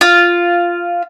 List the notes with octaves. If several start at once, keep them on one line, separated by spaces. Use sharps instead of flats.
F4